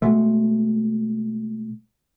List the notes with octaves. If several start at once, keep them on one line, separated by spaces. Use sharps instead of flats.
B2 G#3 A3